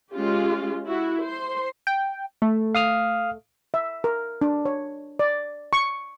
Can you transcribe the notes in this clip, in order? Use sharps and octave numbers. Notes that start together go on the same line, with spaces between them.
G#3 C#4 F4 G4
E4 F#4
C5 C6
G5
A3
F5 D#6 F6
E5
A#4
D4
C#5
D5
C#6